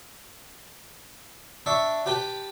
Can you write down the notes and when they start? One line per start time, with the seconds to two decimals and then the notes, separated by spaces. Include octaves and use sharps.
1.66 D4 E5 C#6
2.06 G4 B4 G5 A5